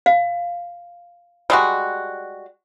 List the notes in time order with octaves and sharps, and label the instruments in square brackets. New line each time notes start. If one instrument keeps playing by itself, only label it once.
[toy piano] F5
[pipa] G3 G#3 F#4